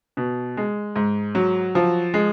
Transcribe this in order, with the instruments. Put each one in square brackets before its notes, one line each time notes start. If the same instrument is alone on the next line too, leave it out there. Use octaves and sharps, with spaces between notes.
[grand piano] B2
G#3
G#2
F#3
F3
G#3